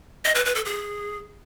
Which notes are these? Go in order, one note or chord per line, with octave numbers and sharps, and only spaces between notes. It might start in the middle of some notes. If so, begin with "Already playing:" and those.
D#5
B4
B4
A4
G#4